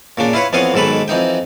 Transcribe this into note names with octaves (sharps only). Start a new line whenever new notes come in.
A#2 C#3 D4
E4 F4 B4 C#5
F2 E3 B3 F4 C#5 D#6
B1 G#2 D#3 A4 B4 B5
F2 E3 D#4 G5